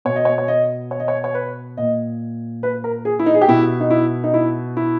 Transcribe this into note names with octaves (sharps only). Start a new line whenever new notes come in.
B2 C#5
D#5
C#5
C#5
D#5
C#5
D#5
C#5
C#5
B4
A#2 D#5
B4
A#4
G#4
E4
D#4
G#4
G4
B2 E4
D#4
E4
D#4
E4
E4